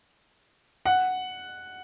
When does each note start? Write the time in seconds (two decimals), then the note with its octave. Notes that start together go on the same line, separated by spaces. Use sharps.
0.86 F#5